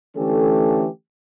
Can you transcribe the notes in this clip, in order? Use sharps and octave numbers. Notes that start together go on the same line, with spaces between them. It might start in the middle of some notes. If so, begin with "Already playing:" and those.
D3 E3 A3 C#4 G4 A4